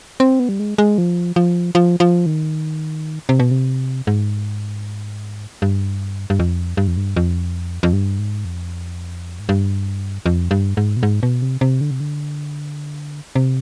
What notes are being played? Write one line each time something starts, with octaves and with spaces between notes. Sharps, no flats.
C4
B3
G3
G#3
G#3
F3
F3
F3
F3
D#3
C3
B2
C3
G#2
G2
G2
F2
G2
F2
G2
F2
F2
G2
G#2
F2
G#2
G2
F2
G2
G#2
B2
G#2
B2
C3
C3
D3
C3
D3
C3